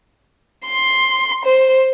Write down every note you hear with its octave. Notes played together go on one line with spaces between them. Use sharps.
C6
C5